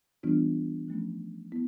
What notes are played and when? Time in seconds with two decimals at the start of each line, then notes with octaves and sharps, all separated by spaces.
0.23 E3 G3 B3 D4 F4
0.88 F3 A3 C#4
1.52 B3 E4